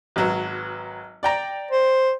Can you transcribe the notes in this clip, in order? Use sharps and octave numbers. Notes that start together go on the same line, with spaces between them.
G#1 F#3 B4
D5 G5 A#5
C5